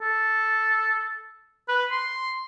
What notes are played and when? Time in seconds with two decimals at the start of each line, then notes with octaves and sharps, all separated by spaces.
0.01 A4
1.69 B4
1.91 C6